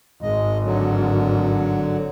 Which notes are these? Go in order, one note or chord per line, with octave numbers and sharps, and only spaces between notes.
G#1 G#3 D#5
D3 F#3